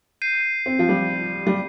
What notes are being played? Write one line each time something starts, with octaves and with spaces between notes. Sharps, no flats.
G6 C7 D#7
C4
F3
G3
G3